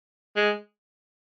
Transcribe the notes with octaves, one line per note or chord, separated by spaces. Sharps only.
G#3